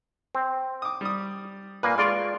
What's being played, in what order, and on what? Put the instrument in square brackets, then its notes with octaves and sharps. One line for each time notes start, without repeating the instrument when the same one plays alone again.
[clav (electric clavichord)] C4
[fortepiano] D6 D#6
G3 D#6
[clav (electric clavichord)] A#2 A#3 [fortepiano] B4 G#5
[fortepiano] G#3 C6 C#6 [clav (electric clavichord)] F4 D5